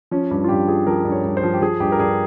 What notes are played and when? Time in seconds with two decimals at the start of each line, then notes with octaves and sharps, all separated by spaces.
0.11 F3 C#4
0.31 G2
0.44 F4
0.48 G2 G4
0.68 F3 G#4
0.87 F3 A#4
1.05 G2
1.12 C#5
1.24 G2
1.37 C5
1.43 F3
1.54 G4
1.61 F3 G#4
1.80 G2 G4
1.92 A#4
1.99 G2 G#4